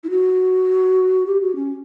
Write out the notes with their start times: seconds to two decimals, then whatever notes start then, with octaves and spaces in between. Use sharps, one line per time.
0.04 E4
0.10 F#4
1.26 G4
1.41 F#4
1.56 C#4